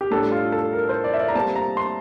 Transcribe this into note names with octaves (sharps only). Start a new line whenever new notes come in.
G4
A2 G3 D4 A4
F4
A4
A#4
C5
D5
E5
D5
A#5
A#2 G3 C4 A5
A#5
C6